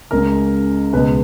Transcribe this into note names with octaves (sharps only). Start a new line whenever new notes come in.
C#2 C#3 G#3 A#4
C#2 B2 G#3 B4